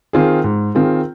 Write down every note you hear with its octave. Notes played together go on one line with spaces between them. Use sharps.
D#3 C4 F4 G#4
G#2
D#3 C4 F4 G#4